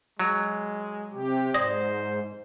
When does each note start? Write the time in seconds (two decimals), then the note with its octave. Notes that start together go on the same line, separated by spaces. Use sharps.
0.20 F#3 G#3
1.12 C3 G4
1.54 G#2 C5 D5 D#6 A#6